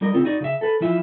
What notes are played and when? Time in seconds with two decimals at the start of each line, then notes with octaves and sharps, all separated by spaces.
0.01 G3 D4 A#4 D#5
0.13 C#3 C4 C#4 F4
0.25 D#4 F#4 D5
0.41 C#3 E5
0.61 A4 B4
0.81 E3 F3 E5